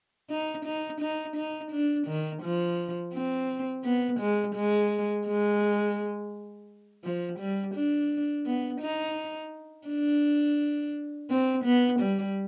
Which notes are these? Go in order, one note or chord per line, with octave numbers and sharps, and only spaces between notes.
D#4
D#4
D#4
D#4
D4
D#3
F3
C4
B3
G#3
G#3
G#3
F3
G3
D4
B3
D#4
D4
C4
B3
G3